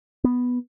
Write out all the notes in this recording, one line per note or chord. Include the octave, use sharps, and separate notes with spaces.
B3